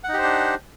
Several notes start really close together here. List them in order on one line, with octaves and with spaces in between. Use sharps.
F#5 D#4 G4 C5 D4